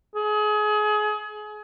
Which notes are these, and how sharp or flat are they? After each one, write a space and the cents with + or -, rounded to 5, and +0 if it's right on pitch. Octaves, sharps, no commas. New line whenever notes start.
G#4 +30